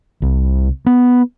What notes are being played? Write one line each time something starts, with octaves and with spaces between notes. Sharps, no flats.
C2
B3